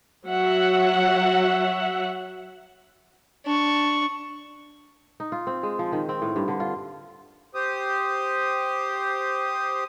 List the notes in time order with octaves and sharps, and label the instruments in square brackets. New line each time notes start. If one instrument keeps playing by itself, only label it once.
[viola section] F#3 E5 F#5
[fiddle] D4 C#6
[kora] D#4
F4
C4
G#3
F3
D#3
C4
A2
G2
D3
F4
[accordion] G4 C5 D#6